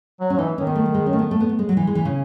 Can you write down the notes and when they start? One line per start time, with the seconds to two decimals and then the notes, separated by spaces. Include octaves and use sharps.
0.20 F#3
0.30 C#4
0.33 F#3
0.38 E3 D#4
0.57 D#3 C#4
0.67 B3
0.75 A3
0.86 A3
0.94 G#3
1.06 C#4
1.13 A3
1.19 B3
1.31 A3
1.40 B3
1.49 A3
1.59 G#3
1.69 F#3
1.77 E3
1.87 G#3
1.95 E3
2.05 C#3